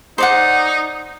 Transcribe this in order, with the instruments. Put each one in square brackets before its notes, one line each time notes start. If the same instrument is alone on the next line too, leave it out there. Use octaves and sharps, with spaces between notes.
[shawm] D#4 [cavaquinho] C5 D5 F#5